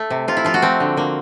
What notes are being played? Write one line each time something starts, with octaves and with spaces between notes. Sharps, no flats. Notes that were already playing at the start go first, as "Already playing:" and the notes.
Already playing: A3
C3
C3 F4
E4
F3 F4
F#4
A3 C4
D3
D3 A#3